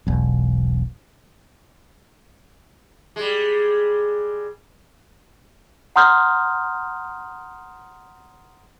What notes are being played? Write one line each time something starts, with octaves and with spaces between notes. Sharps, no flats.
E1 B1
G3 G#3
F#5 A#5 C6 D#6 F6 G6